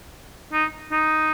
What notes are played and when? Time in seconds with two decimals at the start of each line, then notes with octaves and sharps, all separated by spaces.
0.52 D#4
0.92 D#4